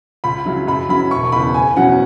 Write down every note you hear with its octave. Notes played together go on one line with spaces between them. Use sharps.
C#2 B5
C#3 F#3 E4
F#2 B5
F#3 C#4 E4 B5
E1 C#6
E2 C#3 B5
F#1 G#5
E2 B2 F#3 C#4 F#5